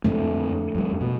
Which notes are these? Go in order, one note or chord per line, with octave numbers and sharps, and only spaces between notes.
F2 D3 F3 A3
F2 G3
B2